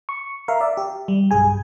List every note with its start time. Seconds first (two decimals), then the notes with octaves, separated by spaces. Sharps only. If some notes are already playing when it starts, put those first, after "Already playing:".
0.09 C#6
0.48 A#4 E5 F5
0.61 D5 E5
0.77 G4
1.08 G3
1.31 B1 G2 G#4 G#5